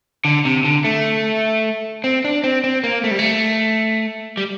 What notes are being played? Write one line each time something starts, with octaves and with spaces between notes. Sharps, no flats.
D3
C3
D3
A3
C4
D4
C4
C4
A#3
A3
G3
A3
G3